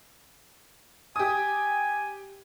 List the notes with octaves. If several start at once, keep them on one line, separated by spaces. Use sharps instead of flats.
G4 G#5 D#6